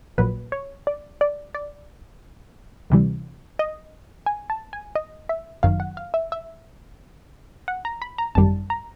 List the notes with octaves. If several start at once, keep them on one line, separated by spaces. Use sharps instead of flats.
A#1 A#2 F#3 B4
C#5
D5
D5
D5
D2 C3 E3 G3
D#5
G#5
A5
G#5
D#5
E5
G1 F#2 D#3 F#3 F5
F#5
F5
E5
E5
F#5
A#5
B5
A#5
G#1 F#2 D#3 G3 A5
A#5